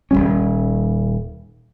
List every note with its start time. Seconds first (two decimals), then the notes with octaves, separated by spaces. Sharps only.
0.11 D#1 G2 G3 C#4